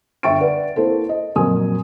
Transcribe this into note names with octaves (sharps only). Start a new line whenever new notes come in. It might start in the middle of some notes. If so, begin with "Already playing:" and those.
G1 E5 G5 C#6 A6 D7
B4 D5 F#5
A#3 E4 A4 C5
D#5
F2 A#2 F#3 A#4 G#5 D#6